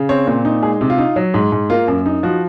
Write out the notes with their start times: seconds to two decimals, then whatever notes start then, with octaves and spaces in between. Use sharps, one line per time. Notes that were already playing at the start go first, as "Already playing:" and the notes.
Already playing: C#3
0.09 C4 C#5
0.27 A#2
0.45 D#4
0.62 G#3 G#4
0.81 C3
0.90 F4
0.98 D#4
1.16 F#3
1.34 G#2
1.52 G#2
1.70 A#3 F4
1.88 F#2
2.06 D#4
2.23 F3 F#4